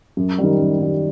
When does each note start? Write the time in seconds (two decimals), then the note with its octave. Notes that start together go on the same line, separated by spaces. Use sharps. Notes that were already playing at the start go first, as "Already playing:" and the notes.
0.17 F#2
0.38 D#3 G3
0.59 F#2
0.79 D#3 G3